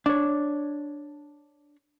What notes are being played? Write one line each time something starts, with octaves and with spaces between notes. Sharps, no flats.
D4 C#5